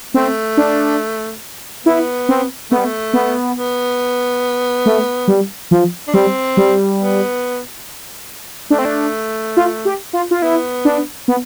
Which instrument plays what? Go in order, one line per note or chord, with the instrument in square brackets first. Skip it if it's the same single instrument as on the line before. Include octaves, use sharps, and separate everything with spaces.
[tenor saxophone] A3 [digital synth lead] C4
[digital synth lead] D4
[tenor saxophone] B3 [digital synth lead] E4
[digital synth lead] C4
[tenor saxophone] A3 [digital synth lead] B3
[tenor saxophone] G3
A3
[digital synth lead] B3
[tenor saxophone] B3
[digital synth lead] A3
G3
F3
[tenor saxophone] D4
[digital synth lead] G3 [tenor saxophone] C4
[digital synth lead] G3
[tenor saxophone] B3
[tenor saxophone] A3 [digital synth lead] D4
[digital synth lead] C4
D4
F4
G4
F4
F4
[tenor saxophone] B3 [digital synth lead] E4
[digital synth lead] D4
B3